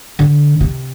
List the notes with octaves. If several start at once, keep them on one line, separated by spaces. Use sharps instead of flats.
D3
C3